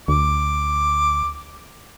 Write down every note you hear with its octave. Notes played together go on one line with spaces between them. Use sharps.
D2 D6